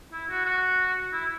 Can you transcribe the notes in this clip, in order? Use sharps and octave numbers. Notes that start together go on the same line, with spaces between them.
E4
F#4
F#4
E4